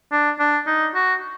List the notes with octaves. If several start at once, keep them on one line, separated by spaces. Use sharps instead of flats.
D4
D4
D#4
F#4